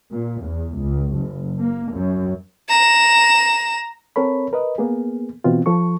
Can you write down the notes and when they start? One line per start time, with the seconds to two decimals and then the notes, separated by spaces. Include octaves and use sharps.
0.11 A#2
0.43 E2
0.77 C#2
1.15 F#1
1.59 A#3
1.92 F#2
2.69 A#5 E7
4.16 C4 A4 A#4 C#5 B5
4.53 A#4 B4 D#5
4.78 A#3 B3 G#4
5.44 B2 E3 C4 F4
5.66 F3 A4 C#6